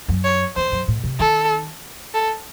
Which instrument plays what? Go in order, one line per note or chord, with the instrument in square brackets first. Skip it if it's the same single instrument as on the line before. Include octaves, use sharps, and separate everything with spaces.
[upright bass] F#2
[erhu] C#5
[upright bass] E2 [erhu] C5
[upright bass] F#2
A2
C3
[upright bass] D#3 [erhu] A4
[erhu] A4